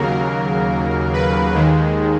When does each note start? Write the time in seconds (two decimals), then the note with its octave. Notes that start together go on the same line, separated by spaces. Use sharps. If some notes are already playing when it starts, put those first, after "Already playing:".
Already playing: D#2 C#3 F#3 A#3 A#4
1.13 B4
1.54 D#2 D#3 G#3